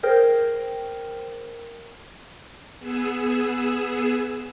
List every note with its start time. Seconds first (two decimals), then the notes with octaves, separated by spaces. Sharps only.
0.03 G#4 A#4 C5 G5 F6
2.79 B3 G#4 E6